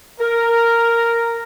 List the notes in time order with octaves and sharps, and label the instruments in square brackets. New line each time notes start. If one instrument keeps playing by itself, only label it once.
[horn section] A#4